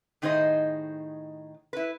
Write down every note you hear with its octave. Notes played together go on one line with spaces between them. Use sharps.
A2 D#3 D#4 G#4 C5 D#5
E4 B4